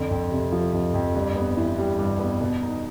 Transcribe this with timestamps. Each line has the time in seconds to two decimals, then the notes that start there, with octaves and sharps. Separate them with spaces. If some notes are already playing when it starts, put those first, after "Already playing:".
Already playing: F2 D3
0.11 F2
0.31 C3
0.52 F3
0.73 F2
0.94 F2
1.15 G2
1.36 B3
1.57 E3
1.78 G3
1.99 G2
2.19 B3
2.41 B2
2.62 D#4